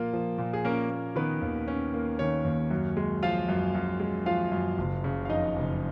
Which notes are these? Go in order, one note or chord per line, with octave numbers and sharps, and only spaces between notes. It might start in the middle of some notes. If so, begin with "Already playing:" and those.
Already playing: A#2 F3 A#3 F4
F3
A#2
G#4
A#3 C#4 A#4
A#3
D#3 B3 B4
D#2
C#4
A#3
D#3 C#4 C#5
D#2
F#2
G#3
F3 F4 F5
F#2
F#2
G#3
F3 F4 F5
F#2
F#1
C#3
F5
F2 D#4 D#5
F#1